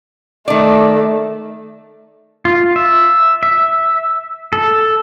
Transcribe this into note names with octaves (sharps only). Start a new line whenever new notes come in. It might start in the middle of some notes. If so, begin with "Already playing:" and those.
D#3 A3 D5
F4
E5
E5
A4